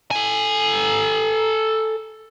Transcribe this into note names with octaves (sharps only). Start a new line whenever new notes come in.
A4 G#5